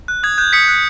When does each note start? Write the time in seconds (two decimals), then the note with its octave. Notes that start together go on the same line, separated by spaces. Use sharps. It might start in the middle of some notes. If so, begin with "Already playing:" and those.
0.08 F#6
0.23 D#6 G#6
0.38 F#6 G6
0.53 D#6 B6 C#7
0.68 F#6